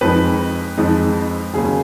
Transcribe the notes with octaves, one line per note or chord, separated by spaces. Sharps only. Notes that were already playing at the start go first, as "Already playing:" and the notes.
F2 F3 G#3 D#4 B4
F2 F3 G#3 D#4
D#2 C#3 F#3 G#4